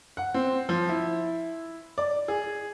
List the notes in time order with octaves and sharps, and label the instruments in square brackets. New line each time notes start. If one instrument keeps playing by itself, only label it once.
[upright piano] F#5
C4
F3
E4
D5
G#4